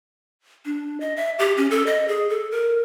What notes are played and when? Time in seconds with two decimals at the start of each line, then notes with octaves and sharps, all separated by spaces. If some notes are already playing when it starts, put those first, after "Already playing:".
0.65 D4
1.00 D#5
1.16 E5
1.39 G4
1.57 C#4
1.71 A4
1.87 D#5
2.08 G#4
2.29 A4
2.51 A#4